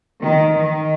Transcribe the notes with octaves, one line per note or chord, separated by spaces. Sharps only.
D#3
D#3